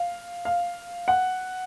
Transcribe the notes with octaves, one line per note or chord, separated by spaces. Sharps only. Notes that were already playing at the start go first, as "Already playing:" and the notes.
Already playing: F5
F5
F#5